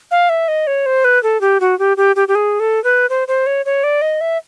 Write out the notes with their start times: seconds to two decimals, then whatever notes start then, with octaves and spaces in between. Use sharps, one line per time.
0.11 F5
0.29 E5
0.48 D#5
0.67 C#5
0.86 C5
1.04 B4
1.23 A4
1.41 G4
1.60 F#4
1.79 G4
1.97 G4
2.16 G4
2.28 G4
2.35 G#4
2.60 A4
2.84 B4
3.09 C5
3.28 C5
3.46 C#5
3.65 C#5
3.84 D5
4.01 D#5
4.21 E5